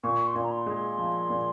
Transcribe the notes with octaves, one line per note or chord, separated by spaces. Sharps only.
A#2 C#6
C6
A#2
A#5
C6
G#3
C6
F3
A#2